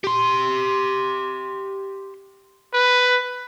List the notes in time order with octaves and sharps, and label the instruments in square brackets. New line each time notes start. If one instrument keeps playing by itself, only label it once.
[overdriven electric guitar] G4 C6
[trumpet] B4